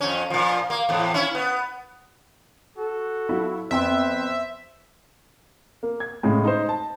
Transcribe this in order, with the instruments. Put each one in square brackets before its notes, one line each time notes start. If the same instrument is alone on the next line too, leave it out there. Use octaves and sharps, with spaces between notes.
[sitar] F2 C#4
A#2 F3
A#3
E2 A2
C#4 E4
B3
[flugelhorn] F#4 [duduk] A4
[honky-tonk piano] F#3 E4 F4
[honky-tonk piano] F2 G5 C6 [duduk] B3 [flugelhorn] C5 [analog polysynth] E5
[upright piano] A#3
G#6
A2 C#3 G#3
D#4 C5
A5